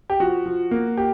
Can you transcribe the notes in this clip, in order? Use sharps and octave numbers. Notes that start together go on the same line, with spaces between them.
G4
F3 F#4
F3
A#3
G4